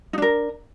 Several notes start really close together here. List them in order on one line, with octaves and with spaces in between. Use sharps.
D#4 D4 A#4